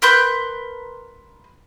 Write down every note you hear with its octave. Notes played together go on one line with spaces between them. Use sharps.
A#4 B4 C6 G6